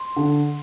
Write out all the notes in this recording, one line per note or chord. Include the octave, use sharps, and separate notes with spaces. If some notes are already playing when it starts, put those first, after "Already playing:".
Already playing: C6
D3